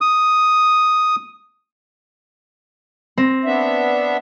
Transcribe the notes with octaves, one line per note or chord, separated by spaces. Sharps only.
D#6
C4 A#6
B3 D4 E5